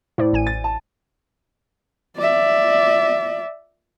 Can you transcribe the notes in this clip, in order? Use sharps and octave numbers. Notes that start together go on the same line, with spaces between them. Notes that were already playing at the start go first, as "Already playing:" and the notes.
A2 E4 C5 D5
A1 G#5 D#7
A6
A5
D5 E5